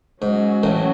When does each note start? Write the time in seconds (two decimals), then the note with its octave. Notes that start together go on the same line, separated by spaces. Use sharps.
0.22 G#2 F#3 C#4 F#4
0.63 A1 A2